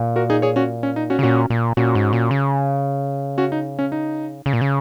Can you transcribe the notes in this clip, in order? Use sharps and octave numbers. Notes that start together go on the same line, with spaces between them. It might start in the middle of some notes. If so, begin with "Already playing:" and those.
Already playing: A#2
F#4 A#4
D#4 G#4
G#4 C#5
C#4 F#4
C#4
D#4
C#4 F#4
C#3
A#2 C#4 F#4
A#2
A#2 C#4 F#4
G#2
A#2
C#3
C#4 F#4
D#4
C#4
D#4
C#3
A#2
C#3